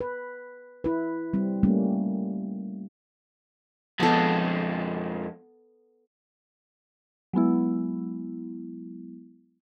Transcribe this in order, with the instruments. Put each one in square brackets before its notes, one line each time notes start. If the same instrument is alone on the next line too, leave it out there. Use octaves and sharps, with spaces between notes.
[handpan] B4
E4 B4
G3 C4
G3 A3 A#3 C#4
[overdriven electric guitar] F2 G#3 [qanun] B3 A4
[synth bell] F#3 G#3 B3 E4